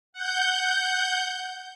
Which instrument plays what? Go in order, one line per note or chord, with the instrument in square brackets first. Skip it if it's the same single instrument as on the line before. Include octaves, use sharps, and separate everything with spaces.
[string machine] F#5 G6